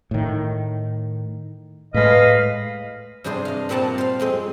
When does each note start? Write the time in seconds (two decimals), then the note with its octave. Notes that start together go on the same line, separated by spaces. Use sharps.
0.11 A2 D#3
1.94 A2 G#3 B4 D#5 F5
3.24 G2 C3 D4 G#4 C5
3.45 D#5 F5
3.69 A#2 G3 C4 F#5 A5 A#5
3.98 C5 F5
4.20 F2 G#3 C4